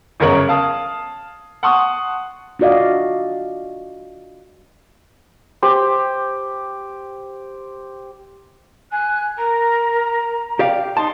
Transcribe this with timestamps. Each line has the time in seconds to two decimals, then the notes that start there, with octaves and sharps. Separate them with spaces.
0.20 G1 F#2 C#3 A#4 C#5 F#7
0.49 F5 A5 D#6
1.63 F#5 A5 C6 C#6 D#6
2.59 D4 F4 F#4 D5 D#5 F5
5.62 G4 C5
8.92 G#5 F#6
9.38 A#4 A#5
10.59 G4 D5 F5 G5
10.97 D#4 A5 C6